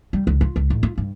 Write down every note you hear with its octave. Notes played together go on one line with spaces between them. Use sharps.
G3
C#2
F4
C#2
A1
F4
G2